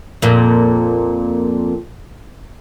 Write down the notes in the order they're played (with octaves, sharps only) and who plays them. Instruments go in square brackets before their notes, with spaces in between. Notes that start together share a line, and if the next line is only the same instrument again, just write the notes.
[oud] F2 A#2